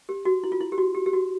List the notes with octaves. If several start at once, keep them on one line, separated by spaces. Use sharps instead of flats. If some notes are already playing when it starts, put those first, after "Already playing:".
G4
F#4
E4
F4
E4
G4
F#4
G4
G4
F#4